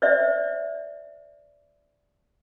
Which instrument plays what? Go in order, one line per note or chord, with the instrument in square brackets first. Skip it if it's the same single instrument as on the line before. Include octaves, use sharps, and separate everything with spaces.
[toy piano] C5 D5 E5